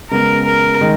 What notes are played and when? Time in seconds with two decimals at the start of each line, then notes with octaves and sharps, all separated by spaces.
0.11 C#3 G#3 B3 A#4
0.46 A#4
0.81 D#3 G#3